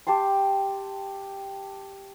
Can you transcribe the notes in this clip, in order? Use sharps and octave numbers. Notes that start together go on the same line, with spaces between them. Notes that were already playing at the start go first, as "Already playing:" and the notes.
G4 G5 A5 C6